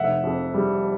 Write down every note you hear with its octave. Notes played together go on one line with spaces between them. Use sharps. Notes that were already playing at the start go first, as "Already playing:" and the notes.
Already playing: F1 E5 F#5
F2
G3